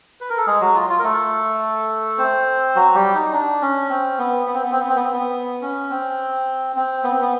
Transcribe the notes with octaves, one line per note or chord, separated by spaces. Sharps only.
B4
A#4
A4
G#3 G#4
F#3 F#4
F4
F4
A#4
A3 A4
C4 C5
F#3 F#4
G3 G4
D#4
D4
C#4
C4
B3
B3
C4
B3
C4
B3
C4
B3
C4
B3
C#4
C4
C4
B3
C4
B3